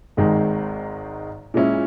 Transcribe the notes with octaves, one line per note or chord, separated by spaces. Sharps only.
G#1 G#2 D#3 G#3 D#4
A#2 G#3 C#4 E4